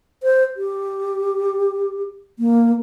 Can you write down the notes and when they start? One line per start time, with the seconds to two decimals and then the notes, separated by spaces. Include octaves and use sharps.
0.23 C5
0.57 G4
2.39 A#3